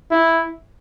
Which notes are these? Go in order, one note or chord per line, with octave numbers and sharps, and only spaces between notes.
E4